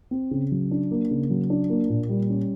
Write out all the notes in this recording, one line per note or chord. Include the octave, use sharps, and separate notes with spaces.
C4
C#3
F#3
D4
A#3
C#3
F#3
D4
A#3
A#2
G3
C#4